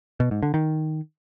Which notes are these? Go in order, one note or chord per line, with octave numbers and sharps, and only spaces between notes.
B2
G#2
D3
D#3